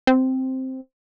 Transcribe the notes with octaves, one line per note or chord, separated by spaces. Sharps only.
C4